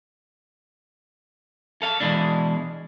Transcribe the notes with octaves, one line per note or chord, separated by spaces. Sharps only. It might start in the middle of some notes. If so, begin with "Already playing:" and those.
A4 F5
B2 E3 G#3 D4